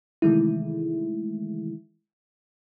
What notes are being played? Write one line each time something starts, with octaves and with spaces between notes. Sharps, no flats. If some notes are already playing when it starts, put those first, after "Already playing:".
C3 D#3 E3 G#3 A3 E4